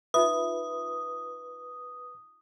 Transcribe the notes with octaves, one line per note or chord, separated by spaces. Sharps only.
D#4 F4 B4 E5 D#6